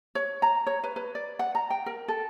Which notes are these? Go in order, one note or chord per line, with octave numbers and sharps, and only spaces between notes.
C#5
A#5
C#5
B4
B4
D5
F#5
A#5
G5
A#4
A4